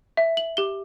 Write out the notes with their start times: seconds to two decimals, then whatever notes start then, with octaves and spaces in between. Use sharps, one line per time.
0.17 E5
0.37 F#7
0.57 G4 G7